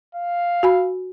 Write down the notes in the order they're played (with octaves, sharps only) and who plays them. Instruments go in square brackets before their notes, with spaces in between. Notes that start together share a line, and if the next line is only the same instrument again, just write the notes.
[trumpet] F5
[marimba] F#4 G#5 B5